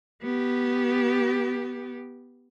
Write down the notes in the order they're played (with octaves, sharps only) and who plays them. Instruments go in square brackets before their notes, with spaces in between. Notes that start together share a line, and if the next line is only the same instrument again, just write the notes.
[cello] B3 G4